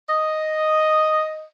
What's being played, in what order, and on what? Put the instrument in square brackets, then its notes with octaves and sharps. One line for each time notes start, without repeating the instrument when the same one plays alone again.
[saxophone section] D#5